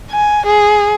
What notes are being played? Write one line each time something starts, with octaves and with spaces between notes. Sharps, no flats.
G#5
G#4